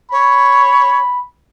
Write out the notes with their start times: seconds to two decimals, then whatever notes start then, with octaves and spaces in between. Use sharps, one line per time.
0.11 C#5 B5